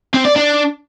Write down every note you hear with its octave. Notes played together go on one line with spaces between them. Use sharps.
C4
D5
D4